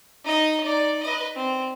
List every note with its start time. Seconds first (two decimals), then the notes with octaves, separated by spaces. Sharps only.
0.24 D#4 D#5
0.64 D#4 D5
1.03 B4 D#5
1.36 C4